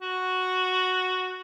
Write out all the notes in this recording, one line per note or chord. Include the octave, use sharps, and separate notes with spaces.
F#4